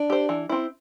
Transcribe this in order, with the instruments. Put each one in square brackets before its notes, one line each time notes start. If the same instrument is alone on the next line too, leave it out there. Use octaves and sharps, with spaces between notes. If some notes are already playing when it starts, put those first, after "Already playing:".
Already playing: [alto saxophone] D4
[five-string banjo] G4 C5
E3
C4 E4